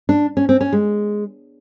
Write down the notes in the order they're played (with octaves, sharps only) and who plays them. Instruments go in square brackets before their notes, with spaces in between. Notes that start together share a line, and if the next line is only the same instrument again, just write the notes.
[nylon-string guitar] D4
C#4
C4
C#4
G#3